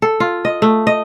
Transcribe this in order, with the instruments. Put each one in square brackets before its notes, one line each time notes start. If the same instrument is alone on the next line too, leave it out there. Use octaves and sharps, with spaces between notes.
[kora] A4
F4
D#5
A3
D#5